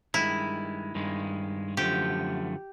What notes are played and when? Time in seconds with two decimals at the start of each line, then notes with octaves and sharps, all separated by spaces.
0.14 G2 D#3 G#3 E4
0.95 G2 D#3 G#3
1.77 F#2 D3 F3 A3 G4